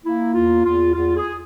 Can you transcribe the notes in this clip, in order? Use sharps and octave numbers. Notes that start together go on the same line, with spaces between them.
A#3 E4
E2 F4
E2 F4
E2 F4
G#4